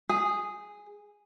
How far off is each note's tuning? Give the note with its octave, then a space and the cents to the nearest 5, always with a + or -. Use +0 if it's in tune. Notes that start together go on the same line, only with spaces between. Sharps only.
G#4 -5